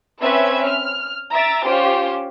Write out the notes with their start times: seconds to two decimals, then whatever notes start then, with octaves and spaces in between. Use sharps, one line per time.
0.21 C4 C#4 B4 E5 G#6
0.65 F6
1.33 E5 A#5 A6 D7
1.65 C#4 F4 G4 C5